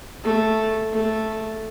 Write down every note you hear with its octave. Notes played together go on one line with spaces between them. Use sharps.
A3
A3